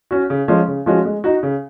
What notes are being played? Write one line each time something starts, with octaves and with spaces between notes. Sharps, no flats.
C#4 F#4
C#3
F3 G#3 C#4
C#3
F3 G#3 C#4 F#4
G#3
D#4 F#4
C#3